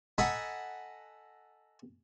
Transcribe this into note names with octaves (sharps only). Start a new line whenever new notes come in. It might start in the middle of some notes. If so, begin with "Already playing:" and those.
A4 D#5 F#5 G#5 A#5 B5